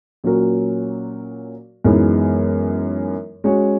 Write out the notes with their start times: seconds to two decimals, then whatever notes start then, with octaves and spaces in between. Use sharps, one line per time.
0.24 A#2 F#3 C#4 F#4 A#4
1.85 F#2 E3 G#3 B3 D#4
3.44 G#3 C#4 F#4 C#5